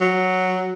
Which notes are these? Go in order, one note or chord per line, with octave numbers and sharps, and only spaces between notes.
F#3